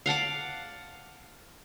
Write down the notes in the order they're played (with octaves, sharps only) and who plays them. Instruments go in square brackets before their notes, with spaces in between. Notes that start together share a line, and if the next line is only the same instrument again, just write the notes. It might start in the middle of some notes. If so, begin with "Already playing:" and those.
[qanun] F5 F#5 A5 D6